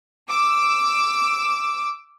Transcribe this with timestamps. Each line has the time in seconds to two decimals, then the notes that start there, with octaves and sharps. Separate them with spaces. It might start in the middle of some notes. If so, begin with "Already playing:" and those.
0.30 D6 E6